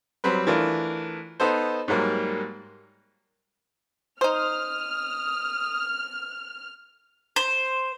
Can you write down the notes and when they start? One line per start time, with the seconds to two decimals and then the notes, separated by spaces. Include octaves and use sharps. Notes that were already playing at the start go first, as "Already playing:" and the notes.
0.24 F#3 G3 C4 B4
0.47 E3 A3 D4 F4 A#4
1.40 B3 D#4 A4 C5
1.88 G#2 F#3 G3 A#3
4.21 D#4 C5 D#6 F6
7.36 C5